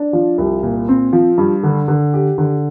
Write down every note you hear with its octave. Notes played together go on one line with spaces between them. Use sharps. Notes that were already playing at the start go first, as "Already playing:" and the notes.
Already playing: D4
F3
C2
A#2
C4
F3
G2
D3
D3
G4
D3